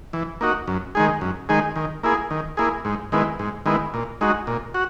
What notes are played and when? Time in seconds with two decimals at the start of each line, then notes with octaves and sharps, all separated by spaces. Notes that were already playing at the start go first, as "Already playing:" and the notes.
0.13 E3
0.41 A#3 D#4 F#4
0.68 F#2
0.95 D#3 G#3 D#4 G#4
1.21 F#2
1.49 D#3 G#3 D#4 G#4
1.76 D#3
2.03 A#3 E4 G#4
2.31 D#3
2.57 A#3 E4 G#4
2.85 G#2
3.12 D#3 G#3 B3 E4
3.39 G#2
3.66 D#3 G#3 B3 E4
3.94 A#2
4.21 G#3 D#4 F#4
4.47 A#2
4.74 F#4